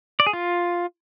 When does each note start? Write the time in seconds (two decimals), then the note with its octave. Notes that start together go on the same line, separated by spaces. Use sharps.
0.20 D5
0.26 G#4
0.33 F4